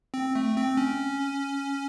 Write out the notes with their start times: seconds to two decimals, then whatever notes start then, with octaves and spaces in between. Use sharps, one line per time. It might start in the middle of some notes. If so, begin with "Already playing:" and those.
0.14 C4
0.35 A3
0.57 C4
0.77 C#4